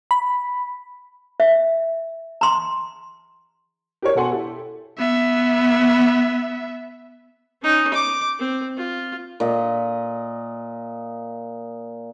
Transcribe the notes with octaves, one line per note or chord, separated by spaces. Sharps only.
B5
E5
A#5 C6
G4 A#4 C#5
B2 F#4 A4 F#5 G#5 C6
E4 G4 A4
B3 E5
C#4 D#4
D6
C4
F4
A#2 D#5